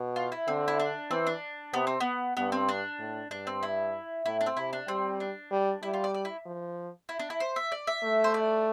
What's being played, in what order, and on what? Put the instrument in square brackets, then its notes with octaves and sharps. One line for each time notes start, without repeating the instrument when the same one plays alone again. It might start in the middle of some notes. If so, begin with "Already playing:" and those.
Already playing: [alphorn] B2
[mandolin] F4
E4
[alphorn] D3 [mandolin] C4
[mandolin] E4
D4
[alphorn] E3 [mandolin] C4
[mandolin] D4
[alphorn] C3 [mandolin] B3
[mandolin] C4
B3
[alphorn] G2 [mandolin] B3
[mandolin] C4
D4
[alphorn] A2
[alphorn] G2 [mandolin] D4
[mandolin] C4
E4
[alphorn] A2 [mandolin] E4
[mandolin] D4
C4
[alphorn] C3 [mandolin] E4
[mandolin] D4
[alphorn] G3 [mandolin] C4
[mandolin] D4
[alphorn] G3
[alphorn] G3 [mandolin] E4
[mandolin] F4
D5
D5
E4
[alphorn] F3
[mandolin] E4
D4
E4
C5
E5
D5
E5
[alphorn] A3
[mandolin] C5
D5